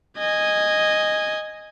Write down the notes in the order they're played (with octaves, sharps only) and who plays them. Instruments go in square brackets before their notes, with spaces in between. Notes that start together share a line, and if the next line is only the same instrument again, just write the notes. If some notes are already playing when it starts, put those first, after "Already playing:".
[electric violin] D#5 G#5